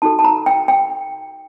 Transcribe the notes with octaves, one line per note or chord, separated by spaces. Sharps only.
D#4 F#4 A4 A5
A5
A#5
G5
G5